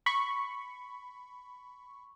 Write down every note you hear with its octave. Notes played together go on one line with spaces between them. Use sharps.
B5 C#6